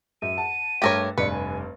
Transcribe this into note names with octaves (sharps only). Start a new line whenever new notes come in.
F#2 E5 D#7
F#5 A5
G2 A3 G4 A#4 C#5 A6
F1 G2 B4 D5 C#7
G#5